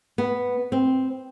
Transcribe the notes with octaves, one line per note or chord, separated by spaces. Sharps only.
B3
C4